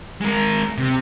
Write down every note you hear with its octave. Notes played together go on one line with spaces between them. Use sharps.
G#3 A#4
C3